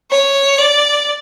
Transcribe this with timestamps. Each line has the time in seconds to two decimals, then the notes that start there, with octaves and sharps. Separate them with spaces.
0.11 C#5
0.58 D5